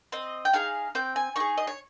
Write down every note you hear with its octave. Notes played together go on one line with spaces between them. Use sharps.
C4 D#5
G5
D#4 G#4 F5
C4 G5
G#5
D#4 G#4 C#6
D#5
C#5